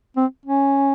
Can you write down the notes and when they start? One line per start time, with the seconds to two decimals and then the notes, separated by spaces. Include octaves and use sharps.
0.17 C4
0.46 C#4